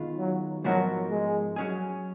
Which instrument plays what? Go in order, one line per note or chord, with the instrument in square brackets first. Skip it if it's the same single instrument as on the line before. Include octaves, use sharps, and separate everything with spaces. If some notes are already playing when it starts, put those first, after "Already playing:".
Already playing: [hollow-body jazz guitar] D#3 G#3 B3 F4 B4
[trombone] F#3
[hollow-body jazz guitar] G#2 F3 B3 F#4 A#4 [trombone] F#3
[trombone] G#3
[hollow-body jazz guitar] F#3 C#4 G#4